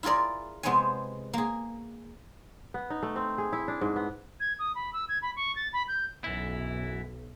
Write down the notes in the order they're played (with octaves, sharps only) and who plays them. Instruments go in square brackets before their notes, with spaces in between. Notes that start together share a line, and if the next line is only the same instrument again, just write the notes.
[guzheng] E4 F4 G#4 A#4 D5
C3 G#3 B3 C5 C#5 G#5
A#3 G#4
[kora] B3
D#4
A3
C4
G#4
E4
D4
G#2
B3
[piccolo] G#6
D#6
B5
E6
G#6
B5
C#6
A6
B5
G6
[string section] B1 [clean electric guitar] F#2 E3 E4